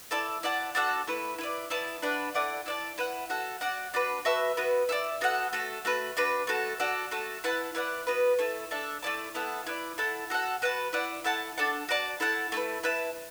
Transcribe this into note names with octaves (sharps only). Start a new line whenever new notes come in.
E4 A4 D5 A5
E4 D5 F#5 A5
D4 F#4 A4 F#5
A3 E4 B4
E4 B4 D5
B3 E4 D5 A5
D4 B4 D5 F#5
A3 E4 D5 F#5
E4 D5 F#5 A5
E4 B4 F#5
F#4 A4 F#5
F#4 D5 F#5
D4 F#4 B4
F#4 B4 E5 A5
B3 F#4 B4
E4 A4 D5
B3 F#4 A4 F#5
A3 F#4 A4
A3 F#4 B4
D4 F#4 B4
A3 F#4 A4
F#4 A4 D5 F#5
A3 F#4 A4
E4 B4 F#5 A5
E4 B4 D5 F#5
B3 F#4 B4
A3 E4 A4
D4 A4 E5
A3 E4 D5 A5
B3 E4 A4 F#5
E4 B4 D5
E4 A4 F#5 A5
F#4 A4 F#5
F#4 B4 F#5 A5
E4 B4 D5 F#5
E4 A4 F#5 A5
D4 A4 F#5 A5
F#4 D5 A5
E4 A4 F#5 A5
A3 E4 B4
E4 B4 E5 A5